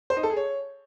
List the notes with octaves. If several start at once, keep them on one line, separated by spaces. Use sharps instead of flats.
C5
D#4
A4
G#4
C#5